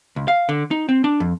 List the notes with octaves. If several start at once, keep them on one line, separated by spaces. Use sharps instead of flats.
C#2
F5
D3
D#4
C4
D4
F2